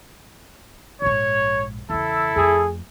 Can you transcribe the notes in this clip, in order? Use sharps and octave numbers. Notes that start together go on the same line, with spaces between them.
A#1 G#2 C#5
E2 C#3 E4 A4
F2 A3 G#4